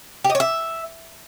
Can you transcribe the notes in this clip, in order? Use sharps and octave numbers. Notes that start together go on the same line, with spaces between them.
G4
D#5
C#5
E5